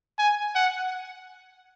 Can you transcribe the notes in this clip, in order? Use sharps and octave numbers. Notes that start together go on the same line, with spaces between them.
G#5
F#5